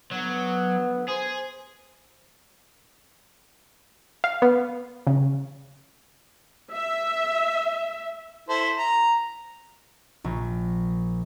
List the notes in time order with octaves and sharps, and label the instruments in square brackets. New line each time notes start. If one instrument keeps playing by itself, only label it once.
[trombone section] D2 B3 [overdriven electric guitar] F#3
[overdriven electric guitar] G#4 [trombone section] C5
[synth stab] F5
B3
C#3
[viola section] E5
[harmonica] E4 A4 C5
A#5
[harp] A#1